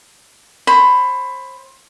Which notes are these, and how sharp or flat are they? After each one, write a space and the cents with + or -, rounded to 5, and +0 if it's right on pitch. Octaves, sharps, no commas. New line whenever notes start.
C5 +35 B5 +15